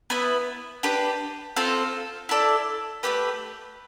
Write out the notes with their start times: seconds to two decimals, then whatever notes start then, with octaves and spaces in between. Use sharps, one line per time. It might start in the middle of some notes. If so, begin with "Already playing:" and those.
0.10 B3 E4 B4
0.83 D4 G4 B4
1.56 C4 F4 A4 C5
2.29 E4 A4 D5
3.03 A3 D4 G4 B4